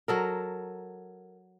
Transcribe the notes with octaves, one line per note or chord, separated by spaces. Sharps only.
F#3 A4 A#4